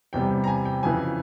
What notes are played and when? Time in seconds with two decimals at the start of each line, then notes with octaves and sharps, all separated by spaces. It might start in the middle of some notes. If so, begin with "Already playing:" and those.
0.13 E2 C3 G3 G5
0.31 G5
0.44 A#5
0.48 G#5
0.65 G5
0.83 F2 C#3 E3 G#5